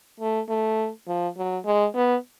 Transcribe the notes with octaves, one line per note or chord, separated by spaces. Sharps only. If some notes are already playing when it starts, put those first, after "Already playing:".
A3
A3
F3
F#3
G#3
B3